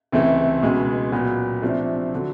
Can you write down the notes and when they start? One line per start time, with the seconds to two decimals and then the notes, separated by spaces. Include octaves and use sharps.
0.12 C#2 C3 E3 A3
0.62 C#2 B2 G#3
1.12 A#2 F#3 B3
1.62 C3 F3 A3 D4
2.14 D3 F#3